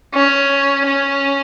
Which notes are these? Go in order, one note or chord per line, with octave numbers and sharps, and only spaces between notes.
C#4
C#4